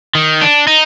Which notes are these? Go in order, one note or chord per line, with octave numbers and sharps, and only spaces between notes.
D#3
D4
D#4